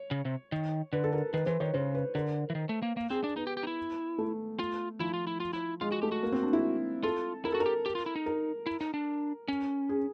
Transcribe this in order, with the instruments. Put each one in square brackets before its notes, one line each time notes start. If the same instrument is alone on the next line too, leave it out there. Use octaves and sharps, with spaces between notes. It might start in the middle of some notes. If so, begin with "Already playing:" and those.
Already playing: [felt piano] C#5
[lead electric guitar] C#3
C3
D#3
[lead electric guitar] D3 [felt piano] B4
[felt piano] A4
A#4
[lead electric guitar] D#3 [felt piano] B4
[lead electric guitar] E3 [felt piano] C5
[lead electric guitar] D#3 [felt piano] C#5
[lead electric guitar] C#3 [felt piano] C5
[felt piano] B4
[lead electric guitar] D3 [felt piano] A#4
[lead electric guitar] E3
D#3
A3
A#3
A#3
[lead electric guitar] C4 [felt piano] G#4
[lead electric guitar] D4
[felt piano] B3 [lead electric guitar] D#4
[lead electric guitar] G4
G4
D#4
E4
[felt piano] A3
[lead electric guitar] F4
[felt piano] F3 [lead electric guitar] E4
[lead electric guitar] F4
E4
F4
E4
[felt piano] G#3 [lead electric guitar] F4
[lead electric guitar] F#4
[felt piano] A3 [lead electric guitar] G4
[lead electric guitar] F#4
[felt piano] A#3
C4
D4
E4
[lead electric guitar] F4 [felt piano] A4
[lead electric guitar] E4 [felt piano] A#4
[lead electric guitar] F#4 [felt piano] A4
[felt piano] A#4
[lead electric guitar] G4
G4
F4
E4
D#4
[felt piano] A#4
[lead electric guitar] E4
D#4
D4
C#4
[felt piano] G#4